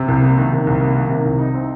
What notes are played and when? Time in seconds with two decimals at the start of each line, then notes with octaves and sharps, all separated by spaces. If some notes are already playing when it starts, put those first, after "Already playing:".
Already playing: C3
0.08 C2
0.22 A#3
0.37 D#3
0.51 C3
0.67 C2
0.80 A#3
0.96 D#3
1.09 C3
1.25 C2
1.39 D#4
1.54 C4